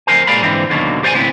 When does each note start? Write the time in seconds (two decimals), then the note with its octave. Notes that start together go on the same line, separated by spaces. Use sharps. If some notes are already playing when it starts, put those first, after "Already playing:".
0.07 F2 F#3 A#4 C5 G#5
0.27 A#2 G#3 A#3 D5 F5 B5
0.42 G#2 D3 E3 C4
0.70 D#2 B2 D3 D#3 F#3 A#3
1.03 G4 C5 D5 F5 G#5
1.15 A2 C#3 B3 C4 E4